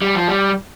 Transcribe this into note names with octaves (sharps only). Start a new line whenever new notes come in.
G3
F3
G3